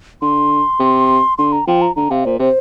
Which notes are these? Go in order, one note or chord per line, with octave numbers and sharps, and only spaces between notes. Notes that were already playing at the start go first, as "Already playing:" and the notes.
D3 C6
C3
D3 C6
A#5
F3 G5
A#5
D3 A#5
C3 F5
A#2 C5
C3 C5